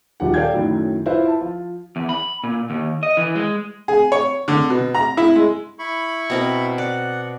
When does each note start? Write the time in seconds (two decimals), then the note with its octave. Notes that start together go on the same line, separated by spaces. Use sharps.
0.20 D#1 D#3 F3 F#3 G4 F#5
0.34 A4 D5 F5 G5 G6 G#6
0.53 F#2 A2 D#3 F#3
1.06 E4 F4 B4 C5 E5
1.27 A5
1.41 F3 F4
1.96 E2
2.09 B5
2.43 A#2
2.70 D#2
3.03 D#5
3.17 E3
3.36 G#3
3.88 G#4
4.12 C#5
4.48 D3
4.70 B2
4.95 A#5
5.17 E4
5.35 G#3
5.79 E4 B5 C#6
6.30 B2 C4 A#4
6.78 D5 F#5